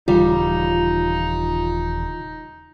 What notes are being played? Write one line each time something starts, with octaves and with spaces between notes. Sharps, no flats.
D#1 C#3 E3 G3 D#4 F4